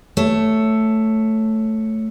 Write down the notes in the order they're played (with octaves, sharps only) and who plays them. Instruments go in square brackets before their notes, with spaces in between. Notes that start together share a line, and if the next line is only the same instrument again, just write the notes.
[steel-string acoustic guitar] A3 C#5